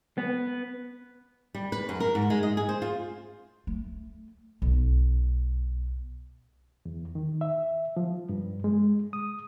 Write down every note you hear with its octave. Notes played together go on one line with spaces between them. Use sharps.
B3
G3
B4
F#2
A#4
G#2
G#3
D#5
G#4
C5
F4
A3
B1
E2
D#3
E5
F3
G2
G#3
D#6